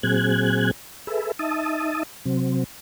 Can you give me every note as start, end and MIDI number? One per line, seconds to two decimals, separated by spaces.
0.03 0.71 46
0.03 0.71 54
0.03 0.71 60
0.03 0.71 68
0.03 0.71 90
0.03 0.71 92
1.07 1.32 68
1.07 1.32 69
1.07 1.32 71
1.07 1.32 76
1.39 2.03 63
1.39 2.03 76
1.39 2.03 81
1.39 2.03 87
2.25 2.64 48
2.25 2.64 54
2.25 2.64 60